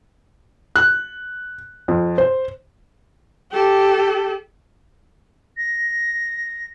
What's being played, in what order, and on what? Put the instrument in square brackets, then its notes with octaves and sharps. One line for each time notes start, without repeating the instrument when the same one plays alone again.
[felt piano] F#6
F2
C5
[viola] G4 A4
[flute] A#6